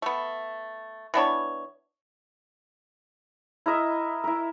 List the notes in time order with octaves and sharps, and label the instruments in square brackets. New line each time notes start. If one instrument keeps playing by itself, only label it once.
[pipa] A3 B3
E3 B3 D4 C#5
[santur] E4 A#4 D#5 E5
E4 A#4